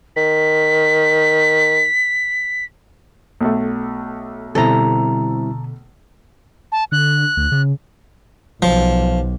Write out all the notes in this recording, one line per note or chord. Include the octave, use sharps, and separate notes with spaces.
D#3 B6
B1 A3
B2 D3 G3 C4 E4 A4 A#5
A5
D3 F#6
D2
C#3
B1 F3